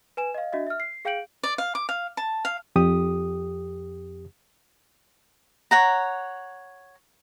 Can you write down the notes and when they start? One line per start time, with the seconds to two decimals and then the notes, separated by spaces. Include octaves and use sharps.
0.17 B4 G#5 E7
0.34 D#5 F5
0.52 D4 F#4 D#5 E5
0.67 E5 F6
0.80 C7
1.05 G#4 F5 G5 G6 D7 F#7
1.43 D5
1.58 F5
1.75 D6
1.89 F5
2.17 A5
2.45 F5
2.76 F2 G4 D#6
5.71 C#5 F#5 A#5